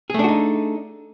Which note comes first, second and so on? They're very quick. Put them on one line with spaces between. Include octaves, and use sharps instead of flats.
G#4 A3 D4 F#4 D#4